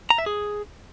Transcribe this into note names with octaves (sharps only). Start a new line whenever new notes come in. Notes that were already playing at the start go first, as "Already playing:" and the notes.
A#5
E5
G#4